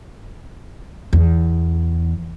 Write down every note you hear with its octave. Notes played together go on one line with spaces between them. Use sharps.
E2